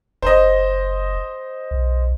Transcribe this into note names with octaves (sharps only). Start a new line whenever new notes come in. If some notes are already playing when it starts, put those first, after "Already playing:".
F#1 C5 D#5
B1